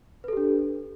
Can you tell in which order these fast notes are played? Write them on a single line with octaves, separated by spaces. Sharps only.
B4 A4 G4 D4